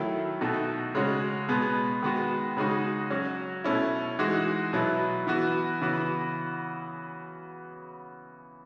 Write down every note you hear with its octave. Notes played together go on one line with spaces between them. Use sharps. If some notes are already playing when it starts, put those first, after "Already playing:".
Already playing: D#3 F#3 A3 E4
B2 A3 D#4 F#4
C#3 G#3 C#4 F#4
B2 G#3 B3
D#3 G#3 B3 F#4
C#3 G#3 D#4 F#4
F#3 C#4 F#4
B2 A3 C#4 E4
E3 G#3 D#4 F#4
B2 F#3 B3 E4
E3 B3 F#4
C#3 E3 B3 F#4